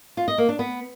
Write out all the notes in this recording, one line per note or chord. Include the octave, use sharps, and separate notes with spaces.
F4
D#5
A#3
D4
B3